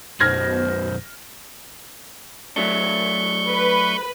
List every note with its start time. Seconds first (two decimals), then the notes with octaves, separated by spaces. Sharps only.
0.20 B1 F#2 B2 C5 F6 G#6 A#6
2.56 F#3 A3 D4 C#6 G6
3.49 B4